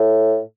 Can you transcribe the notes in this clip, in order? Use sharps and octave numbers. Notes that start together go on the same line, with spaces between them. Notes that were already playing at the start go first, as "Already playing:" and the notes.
Already playing: A2